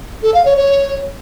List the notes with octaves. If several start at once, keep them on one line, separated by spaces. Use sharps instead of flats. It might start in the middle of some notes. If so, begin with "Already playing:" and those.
A4
F5
C#5
C#5